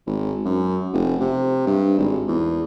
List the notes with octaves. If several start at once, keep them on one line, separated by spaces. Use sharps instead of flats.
G#1
F#2
F1
C3
G2
G#1
E2